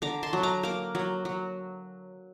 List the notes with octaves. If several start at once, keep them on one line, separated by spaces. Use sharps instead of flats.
D3 A#5 D6
A5 C6
F#3
A#5 D6
A#3 A#5 D6
F#3
F#3